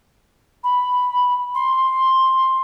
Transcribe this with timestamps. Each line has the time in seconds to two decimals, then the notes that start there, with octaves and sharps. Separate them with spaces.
0.63 B5
1.54 C6